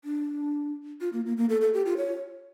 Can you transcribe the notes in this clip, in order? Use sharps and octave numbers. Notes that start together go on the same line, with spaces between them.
D4
F4
A#3
A#3
A#3
A4
A4
G4
F4
C#5